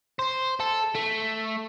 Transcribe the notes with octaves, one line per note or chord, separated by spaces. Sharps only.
C5
A4
A3